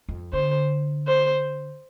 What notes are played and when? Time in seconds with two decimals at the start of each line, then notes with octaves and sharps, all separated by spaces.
0.09 F2
0.33 D3 C5
1.07 C5